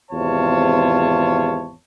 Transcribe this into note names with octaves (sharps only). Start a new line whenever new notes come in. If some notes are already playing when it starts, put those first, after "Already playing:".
G#1 E2 C3 F4 C#5 A5